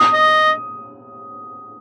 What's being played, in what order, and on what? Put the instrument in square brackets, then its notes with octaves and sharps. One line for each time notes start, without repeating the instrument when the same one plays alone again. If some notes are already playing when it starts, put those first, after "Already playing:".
Already playing: [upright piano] D#6
[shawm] D#5